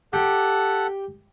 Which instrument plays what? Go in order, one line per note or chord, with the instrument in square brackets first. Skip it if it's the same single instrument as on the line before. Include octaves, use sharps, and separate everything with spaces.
[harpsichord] G4 G5 [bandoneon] A4 F#5